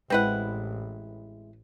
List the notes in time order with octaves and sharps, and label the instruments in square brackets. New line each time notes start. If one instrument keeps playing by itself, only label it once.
[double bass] A1 [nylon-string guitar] G#3 E4 [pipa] C4 B4 F#5